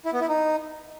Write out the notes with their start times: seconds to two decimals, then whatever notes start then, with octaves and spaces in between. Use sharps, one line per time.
0.06 E4
0.13 B3
0.21 E4
0.29 D#4